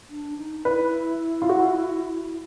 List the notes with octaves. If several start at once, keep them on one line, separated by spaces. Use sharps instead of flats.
D4
D#4
E4 B4
F4
F#4